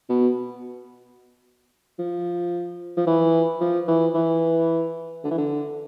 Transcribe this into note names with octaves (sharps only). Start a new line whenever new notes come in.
B2
F3
F3
E3
F3
E3
E3
D3
E3
D3